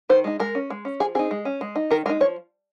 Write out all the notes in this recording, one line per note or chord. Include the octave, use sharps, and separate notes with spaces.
D#3 C5
G#3 D#4
G#3 A#4
C#4
G#3
C#4
F3 G#4
C4 D#4 G#4
G#3
C#4
G#3
D#4
D#3 A#4
G#3 D#4 A#4
F3 C#5